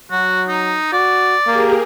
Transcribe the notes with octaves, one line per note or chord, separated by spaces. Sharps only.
F#3 F#4
D#4
F#4 D5
A#3 G4 G#4 A#4